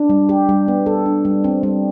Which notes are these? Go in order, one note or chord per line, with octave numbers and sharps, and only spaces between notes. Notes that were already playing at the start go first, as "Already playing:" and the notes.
Already playing: D4
G3
G4
G3
B3
A4
D4
G3
C4
G3